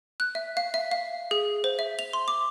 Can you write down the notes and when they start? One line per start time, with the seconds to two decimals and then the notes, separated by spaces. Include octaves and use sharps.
0.20 F#6
0.35 E5
0.57 F5
0.74 E5
0.91 F5
1.31 G#4
1.64 C5
1.79 E5
1.99 F7
2.13 C6
2.28 D6